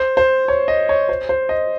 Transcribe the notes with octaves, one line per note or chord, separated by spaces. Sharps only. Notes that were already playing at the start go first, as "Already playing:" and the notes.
Already playing: C5
C5
C#5
D#5
C#5
C5
C5
D#5